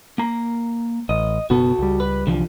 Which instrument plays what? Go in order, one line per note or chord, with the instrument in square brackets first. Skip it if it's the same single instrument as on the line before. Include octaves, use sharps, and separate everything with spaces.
[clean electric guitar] A#3 A#5
[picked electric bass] A1 [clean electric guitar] D#5
[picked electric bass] F#1 B2 B3 [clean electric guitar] F#4 A4
[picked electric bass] C#2 G3
[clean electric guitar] B4
[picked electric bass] C2 [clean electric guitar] D3 E3 F3